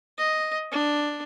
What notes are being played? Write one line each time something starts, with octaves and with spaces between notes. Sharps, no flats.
D#5
D4